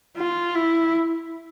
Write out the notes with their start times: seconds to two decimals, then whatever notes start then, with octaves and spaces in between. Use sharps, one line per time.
0.17 F4
0.55 E4